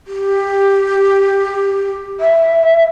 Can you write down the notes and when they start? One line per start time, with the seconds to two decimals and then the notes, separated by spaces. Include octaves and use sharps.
0.07 G4
2.20 E5